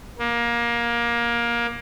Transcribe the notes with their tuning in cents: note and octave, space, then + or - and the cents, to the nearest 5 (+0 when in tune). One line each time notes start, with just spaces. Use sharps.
A#3 +20